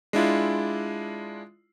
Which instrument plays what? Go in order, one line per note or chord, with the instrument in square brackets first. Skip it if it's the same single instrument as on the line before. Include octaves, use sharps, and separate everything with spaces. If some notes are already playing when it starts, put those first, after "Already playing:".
[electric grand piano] G#3 D4 E4 F4